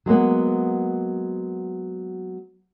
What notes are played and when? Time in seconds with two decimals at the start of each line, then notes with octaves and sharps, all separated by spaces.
0.06 F#3 G#3 A#3 B3